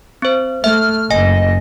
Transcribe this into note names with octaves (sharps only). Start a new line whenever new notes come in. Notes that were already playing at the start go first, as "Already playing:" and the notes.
C4 C5
A3 E5 F6
F#1 D#5 G#5